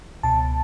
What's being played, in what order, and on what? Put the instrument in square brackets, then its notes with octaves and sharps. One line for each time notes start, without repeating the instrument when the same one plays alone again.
[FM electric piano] C#2 B2 A5